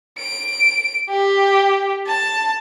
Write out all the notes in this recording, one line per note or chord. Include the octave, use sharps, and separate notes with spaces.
D7
G4
A5